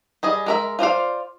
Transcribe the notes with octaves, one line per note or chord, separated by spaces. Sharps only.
G3 G#4 D#5
G#3 A#4 E5
F4 C5 D5 F5